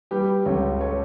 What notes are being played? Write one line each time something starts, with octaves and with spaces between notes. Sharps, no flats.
G3 G4 B4
C#2 A4 C#5
A4 C#5